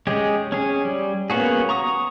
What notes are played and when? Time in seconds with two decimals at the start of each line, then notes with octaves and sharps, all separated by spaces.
0.07 G#3 C#4 G4 G#4
0.52 C#4 G#4
0.85 G3
1.30 A#3 B3 C#4 F#4 G#4
1.69 A#5 C#6 D#6